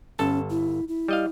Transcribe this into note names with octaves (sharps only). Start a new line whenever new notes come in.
G1 C#4 A4 A5
E4
E4
G3 D#5 F5